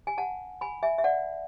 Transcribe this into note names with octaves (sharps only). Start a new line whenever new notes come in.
G#5
F#5 A5
G#5 B5
E5 G#5
E5
D5 F#5